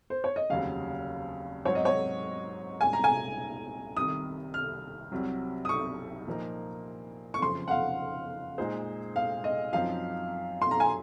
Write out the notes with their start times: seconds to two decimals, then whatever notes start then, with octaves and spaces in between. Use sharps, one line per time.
0.10 C5
0.24 C#5
0.36 D#5
0.50 F1 D#2 C#3 F#3 F5
1.65 G#2 F#3 C4 F#4 C#5
1.75 D#5
1.85 C#5
2.81 C2 A#2 G#3 C#4 G#5
2.93 A#5
3.04 G#5
3.96 C2 C3 D#3 D#6
4.54 F6
5.12 C2 C3 F#3
5.65 D#6
5.69 C#6
6.27 A#2 F3 A#3 D#4
7.34 C#6
7.42 F#1 F2 C#3 F3 C6
7.68 F#5
7.71 F5
8.58 A#2 G#3 D#4 G#4 C5
9.16 F5
9.44 D#5
9.73 F#2 F3 C4 D#4 F5
10.62 C6
10.71 A#5
10.80 G#5